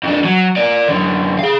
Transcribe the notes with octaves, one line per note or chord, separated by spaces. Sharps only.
F2 D4
F#3
A#4 D5
F#2 D3
G#4 F5